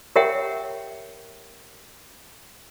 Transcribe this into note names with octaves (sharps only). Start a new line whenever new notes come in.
G4 A#4 C#5 E5 F#5 G5